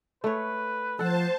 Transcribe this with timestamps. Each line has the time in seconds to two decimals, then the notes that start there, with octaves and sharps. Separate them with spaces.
0.24 A3 B4 C#5
0.99 F3 A4 C5 F#5 A5